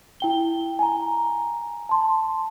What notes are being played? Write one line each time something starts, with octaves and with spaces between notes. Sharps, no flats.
E4 G5 G7
G#5 A#5
A5 C6